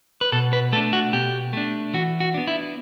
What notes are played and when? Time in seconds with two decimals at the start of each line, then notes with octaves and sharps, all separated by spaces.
0.21 B4
0.32 B2 A4
0.53 B4
0.72 A3 A4
0.76 D4
0.93 F#4
1.13 B2 G4
1.53 A3 D4
1.94 E3 F#4
2.20 F#4
2.34 B3 D4
2.47 E4